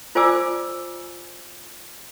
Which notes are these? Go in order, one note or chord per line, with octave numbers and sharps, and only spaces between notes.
F4 C5 D5 G#5 D6 E6